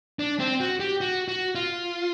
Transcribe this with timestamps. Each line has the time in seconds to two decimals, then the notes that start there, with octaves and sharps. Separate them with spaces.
0.19 D4
0.39 C4
0.61 F#4
0.80 G4
1.01 F#4
1.28 F#4
1.55 F4